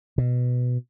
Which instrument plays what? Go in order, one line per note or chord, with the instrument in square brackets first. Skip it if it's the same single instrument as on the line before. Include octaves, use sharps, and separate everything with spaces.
[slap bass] B2